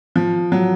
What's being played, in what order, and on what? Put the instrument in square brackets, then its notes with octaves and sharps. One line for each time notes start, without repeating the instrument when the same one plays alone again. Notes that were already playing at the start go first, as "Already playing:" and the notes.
[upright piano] F3
F#3